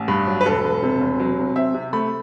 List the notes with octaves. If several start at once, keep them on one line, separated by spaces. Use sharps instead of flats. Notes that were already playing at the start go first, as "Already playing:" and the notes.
Already playing: A1
G2
F#3
B4
E1 A4
E1
C3
E1
F#3
C3
C4 E5
C3
A3 B5